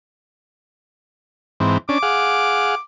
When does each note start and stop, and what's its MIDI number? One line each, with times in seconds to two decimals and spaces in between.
1.60 1.78 44
1.60 1.78 52
1.60 1.78 60
1.89 1.98 61
1.89 1.98 62
1.89 2.80 86
2.03 2.75 68
2.03 2.75 77
2.03 2.75 78